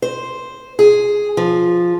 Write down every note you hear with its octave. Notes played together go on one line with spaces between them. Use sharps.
C5
G#4
F3